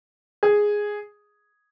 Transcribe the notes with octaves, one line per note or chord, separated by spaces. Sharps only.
G#4